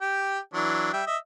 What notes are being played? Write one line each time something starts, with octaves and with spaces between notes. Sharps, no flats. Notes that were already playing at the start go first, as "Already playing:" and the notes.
G4 G5
E3 F#3 D4
G3 E5 G5
D#5 E5